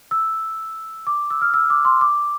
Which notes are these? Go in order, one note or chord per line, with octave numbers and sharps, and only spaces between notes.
E6
D6
E6
F6
E6
D6
C6
D6